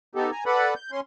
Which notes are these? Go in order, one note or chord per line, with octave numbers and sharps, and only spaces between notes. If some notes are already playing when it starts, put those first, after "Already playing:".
B3 D#4 G4 A4
G#5 A#5
A4 B4 D5 F#5 B5
G6
C#4 C6